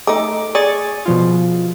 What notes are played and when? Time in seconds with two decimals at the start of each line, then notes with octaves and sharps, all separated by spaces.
0.07 A3 D#4 D6
0.55 G#4 D5 G#5 C#6 A6
1.06 B2 F3 F4